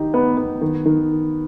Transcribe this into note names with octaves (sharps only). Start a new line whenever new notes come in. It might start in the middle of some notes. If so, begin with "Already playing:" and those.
Already playing: D#3 D#4 G4
B3
B3
D#3
D#3